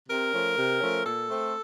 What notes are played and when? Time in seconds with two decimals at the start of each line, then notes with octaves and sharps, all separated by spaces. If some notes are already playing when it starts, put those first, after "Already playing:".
0.09 C3 A#4
0.33 F3 A3 C#4
0.56 C3
0.80 F3 A3 C#4
1.04 A#2 A4
1.29 A3 C4